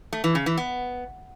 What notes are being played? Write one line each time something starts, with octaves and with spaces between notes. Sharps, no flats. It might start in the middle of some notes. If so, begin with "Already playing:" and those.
A3
E3
C#3
E3
B3